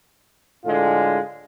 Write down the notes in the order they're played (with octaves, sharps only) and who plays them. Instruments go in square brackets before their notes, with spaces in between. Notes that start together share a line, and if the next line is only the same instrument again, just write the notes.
[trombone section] A2 D3 G#3 F4